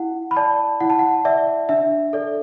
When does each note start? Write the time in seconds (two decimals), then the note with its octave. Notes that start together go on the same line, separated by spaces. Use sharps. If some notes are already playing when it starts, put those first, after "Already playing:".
Already playing: E4 F#5
0.31 B5
0.36 D5 A5
0.80 E4 F#5
0.90 A5
0.99 F#5
1.25 D5 E5
1.69 D4 E5
2.13 A4 D5